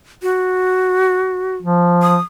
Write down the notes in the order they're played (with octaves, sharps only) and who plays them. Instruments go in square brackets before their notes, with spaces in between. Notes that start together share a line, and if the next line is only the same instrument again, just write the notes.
[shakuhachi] F#4
[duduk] F3
[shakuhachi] D#6